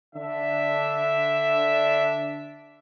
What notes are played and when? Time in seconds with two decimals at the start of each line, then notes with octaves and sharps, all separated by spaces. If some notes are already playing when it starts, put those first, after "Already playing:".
0.16 D3 D4 E5